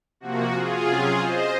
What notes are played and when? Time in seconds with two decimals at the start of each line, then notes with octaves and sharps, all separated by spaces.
0.20 C3 F3 A#3 F#4
0.52 F4 G#4
0.85 C3 F#3 C#4
1.17 C5 D#5